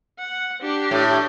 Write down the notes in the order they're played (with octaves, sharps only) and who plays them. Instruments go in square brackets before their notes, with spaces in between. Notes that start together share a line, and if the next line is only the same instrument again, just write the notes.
[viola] F#5
D4 G4
[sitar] A2